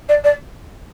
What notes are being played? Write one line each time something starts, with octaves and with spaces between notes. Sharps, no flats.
D5
D5